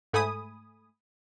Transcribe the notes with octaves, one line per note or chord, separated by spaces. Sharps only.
G#2 A3 G#5 B5 D#6